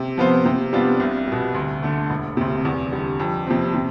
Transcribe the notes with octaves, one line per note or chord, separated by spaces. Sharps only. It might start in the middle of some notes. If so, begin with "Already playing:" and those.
Already playing: C3
F3 B3 F4 C5
C3
G3 B3 D4 F4
C2
B2 G3
D2
D3 A3
E1
D2 C3
E2
D3 G3
F2
C3 F3 C4
C3